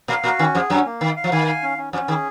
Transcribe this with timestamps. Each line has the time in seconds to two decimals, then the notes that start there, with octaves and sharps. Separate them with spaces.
0.08 A#2 A#3 F5
0.24 A#2 A#3 F#4
0.39 D#3 C#4
0.55 F2 F3 G#4
0.70 F#2 F#3 C#4
0.86 A#3
1.00 D#3 F5
1.17 F5
1.24 F3
1.32 D#3 G#5
1.47 F5
1.63 C#4
1.78 C#4
1.93 F2 F3 C#4
2.08 D#3 G#4